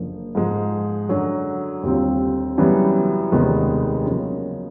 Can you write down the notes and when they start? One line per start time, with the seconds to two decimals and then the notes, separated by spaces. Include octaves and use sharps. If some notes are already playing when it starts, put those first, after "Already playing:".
Already playing: F#1 F#2 D3 F3 A#3
0.35 G#2 F3 G#3
1.09 F#2 D3 F#3
1.83 D#2 D3 G3 C4 F4
2.58 F#2 C#3 E3 G3 B3
3.32 F1 D#2 D#3 G#3 B3
4.07 F#2 C#3 F3 A#3